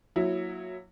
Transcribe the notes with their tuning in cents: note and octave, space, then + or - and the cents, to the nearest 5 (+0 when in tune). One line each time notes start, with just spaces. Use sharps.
F#3 -15 A#3 +0 E4 +0